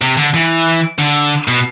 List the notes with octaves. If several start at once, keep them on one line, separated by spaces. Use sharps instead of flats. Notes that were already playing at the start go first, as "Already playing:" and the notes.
C3
D3
E3
D3
B2